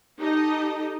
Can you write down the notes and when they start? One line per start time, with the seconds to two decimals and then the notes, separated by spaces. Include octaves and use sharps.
0.19 D#4 G4 A4 D#5